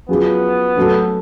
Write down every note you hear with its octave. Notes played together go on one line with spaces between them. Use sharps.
F#3 B3 C#4 F4 G#4
F#3 A3 C#4 F#4 A4